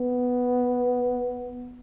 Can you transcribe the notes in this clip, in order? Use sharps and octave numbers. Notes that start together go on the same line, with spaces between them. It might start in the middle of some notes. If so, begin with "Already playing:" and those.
Already playing: B3